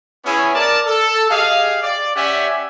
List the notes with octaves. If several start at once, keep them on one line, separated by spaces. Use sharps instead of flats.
B3 C#4 E4 G#4 C#5 G#5
A#4 D5 A5
A4
G4 G#4 D#5 F5
D5
C#4 G4 D5 E5 F#5 G#5